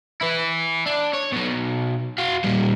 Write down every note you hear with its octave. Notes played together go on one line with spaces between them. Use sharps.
E4 B4
D4
C#5
B2 F#3
F#4 F5
A#2 G3